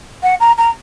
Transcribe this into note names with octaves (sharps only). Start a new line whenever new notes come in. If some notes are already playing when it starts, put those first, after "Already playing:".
F#5
A#5
A#5